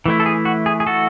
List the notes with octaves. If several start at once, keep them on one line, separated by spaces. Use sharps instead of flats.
E3 A3 E4
A4
G#4
F#4
G#4
G#4
F#4 A4